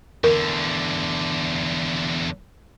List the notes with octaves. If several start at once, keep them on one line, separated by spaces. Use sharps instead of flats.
E2 D3 A#4